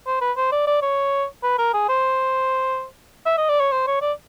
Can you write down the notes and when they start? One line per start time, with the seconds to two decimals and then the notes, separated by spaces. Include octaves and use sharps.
0.07 C5
0.21 B4
0.37 C5
0.52 D5
0.67 D5
0.82 C#5
1.43 B4
1.58 A#4
1.74 G#4
1.89 C5
3.26 E5
3.38 D#5
3.49 D5
3.60 C#5
3.72 C5
3.87 C#5
4.02 D5